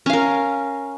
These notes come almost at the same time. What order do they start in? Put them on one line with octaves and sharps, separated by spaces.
C#4 F5 A#4